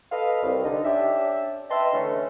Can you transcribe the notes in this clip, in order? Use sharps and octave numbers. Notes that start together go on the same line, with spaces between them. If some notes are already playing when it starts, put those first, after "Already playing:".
A4 B4 D#5 F5
C2
D3 D#4
C#4 D4 G4 E5
B4 D#5 E5 G5 A5 C6
D3 E3 A3 C#4